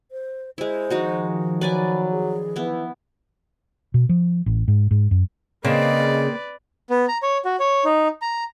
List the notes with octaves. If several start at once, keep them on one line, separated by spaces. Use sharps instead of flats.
C5
G#3 E4 C5
D#3 F3 G#3 D#4 F#4
F#3 B4 D5 G#5 B5
G#4
E3 B3 E4
B2
F3
A1
G#2
G#2
F#2
C#3 A#3 C4 B4 D5 D#5
B3
A#5
C#5
F#4
C#5
D#4
A#5